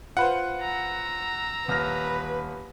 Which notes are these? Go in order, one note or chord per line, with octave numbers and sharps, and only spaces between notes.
F4 B4 C5 F#5
A#5 E6
D#1 B4 F6 A#6